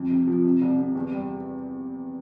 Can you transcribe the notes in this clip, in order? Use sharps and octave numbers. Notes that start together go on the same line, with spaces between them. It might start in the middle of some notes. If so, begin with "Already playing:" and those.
Already playing: F2
C3
F3
C3
C2
C3
E2
G3